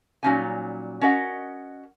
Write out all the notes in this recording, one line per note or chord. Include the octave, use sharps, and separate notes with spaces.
A#2 F#3 G3 C#4 D#4 G#5
C#4 F#4 A#4 D#5 F#5